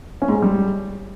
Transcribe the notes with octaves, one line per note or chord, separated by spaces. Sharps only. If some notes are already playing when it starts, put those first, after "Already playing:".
C#4
G#2
G#3
G3